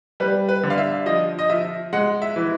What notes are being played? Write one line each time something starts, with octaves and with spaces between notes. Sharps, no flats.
G3 B4
B4
D3
F5
E5
F3 D#5
D#5
F3 E5
G#3 F#5
E5
E3